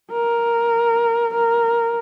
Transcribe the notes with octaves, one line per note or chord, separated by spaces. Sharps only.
A#4
A#4